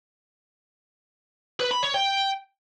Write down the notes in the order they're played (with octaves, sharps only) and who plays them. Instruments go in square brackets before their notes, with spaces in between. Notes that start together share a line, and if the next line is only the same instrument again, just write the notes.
[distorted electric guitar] B4
B5
C#5
G5